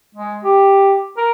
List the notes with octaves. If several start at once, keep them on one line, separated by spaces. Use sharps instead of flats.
G#3
G4
A#4